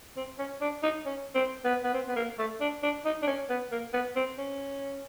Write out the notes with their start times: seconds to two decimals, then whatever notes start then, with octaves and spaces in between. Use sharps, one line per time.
0.16 C4
0.39 C#4
0.61 D4
0.83 D#4
1.05 C#4
1.35 C4
1.64 B3
1.84 B3
1.94 C4
2.08 B3
2.16 A#3
2.38 A3
2.60 D4
2.83 D4
3.05 D#4
3.22 D4
3.27 C#4
3.49 B3
3.71 A#3
3.93 B3
4.16 C4
4.38 C#4